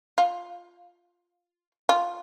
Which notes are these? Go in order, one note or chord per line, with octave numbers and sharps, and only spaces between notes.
F4
F4